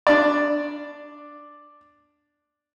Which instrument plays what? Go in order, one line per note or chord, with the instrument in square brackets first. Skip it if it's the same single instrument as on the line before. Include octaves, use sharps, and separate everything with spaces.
[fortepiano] D4 D5